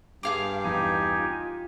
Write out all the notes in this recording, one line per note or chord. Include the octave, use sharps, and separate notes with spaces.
G2 G#4 F5 D6
E2 D#4 G4 G#5
F4